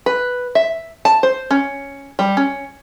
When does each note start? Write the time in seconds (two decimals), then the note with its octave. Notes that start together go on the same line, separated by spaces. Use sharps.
0.06 B4
0.55 E5
1.05 A5
1.23 C5
1.51 C#4
2.19 G3
2.37 C#4